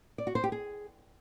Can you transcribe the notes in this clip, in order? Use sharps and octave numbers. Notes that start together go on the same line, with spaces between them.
D5
F#4
C5
G4
G#4